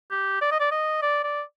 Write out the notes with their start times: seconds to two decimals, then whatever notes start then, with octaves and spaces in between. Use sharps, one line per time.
0.11 G4
0.41 D5
0.51 D#5
0.60 D5
0.71 D#5
1.02 D5
1.23 D5